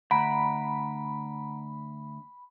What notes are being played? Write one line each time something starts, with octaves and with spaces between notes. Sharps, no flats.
D2 F#5 A#5 B5 D7